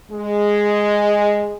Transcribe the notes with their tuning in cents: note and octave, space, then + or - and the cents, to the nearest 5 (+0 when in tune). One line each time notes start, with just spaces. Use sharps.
G#3 -5